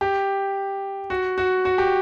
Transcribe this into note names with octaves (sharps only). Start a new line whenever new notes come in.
G4
F#4
F#4
F#4
G4